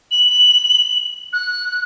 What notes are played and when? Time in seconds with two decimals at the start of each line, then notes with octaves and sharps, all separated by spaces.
0.11 F#7
1.33 F#6